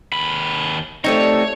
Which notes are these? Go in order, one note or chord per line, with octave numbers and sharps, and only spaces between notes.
D#2 B5
A3 C4 D#4 G4 A4 C#5 D5